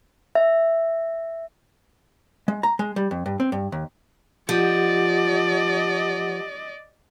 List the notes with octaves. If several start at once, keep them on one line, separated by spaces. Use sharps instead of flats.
E5
G#3
A#5
G#3
G3
F2
G2
C4
G2
D#2
F3 G4 D5 D#5 F#5